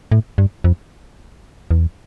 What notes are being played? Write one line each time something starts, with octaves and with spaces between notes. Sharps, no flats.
A2
G2
F2
E2